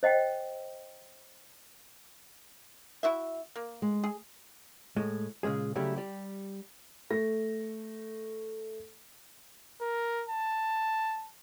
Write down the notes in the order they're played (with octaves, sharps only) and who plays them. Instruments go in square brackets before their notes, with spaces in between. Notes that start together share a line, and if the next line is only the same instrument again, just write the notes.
[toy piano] C5 D#5 F#5 G5
[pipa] E4 F#4 E5
A#3
[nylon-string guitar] G#3
[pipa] G#4
[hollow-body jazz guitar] A2 G#3
A#2 C#3 G#3 G#4
C#3 F#3 G3 A3 E4 G4
G3 G4
[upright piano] A3 A#6
[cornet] A#4
A5